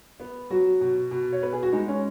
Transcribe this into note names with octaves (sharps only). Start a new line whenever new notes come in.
B3
F#3 F#4
B2
B2
C#5
B3 B4
G#4
F#4
G#3 D#4
C#4